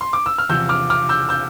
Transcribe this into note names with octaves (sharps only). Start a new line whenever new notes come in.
C6
D6
E6
F6
E2 C3 F3 E6 G6
D6 F6
D6 F6
E6 G6
E6 G6